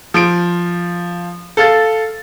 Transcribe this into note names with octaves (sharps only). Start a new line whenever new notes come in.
F3 D7
A4 F5 A6